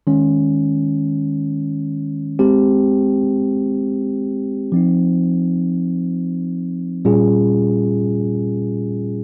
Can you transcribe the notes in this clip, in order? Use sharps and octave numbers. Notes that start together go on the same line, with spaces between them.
D#3 G#3 C#4
G#3 C4 G4
F3 C4 D#4
A#2 G3 C#4 F4 G#4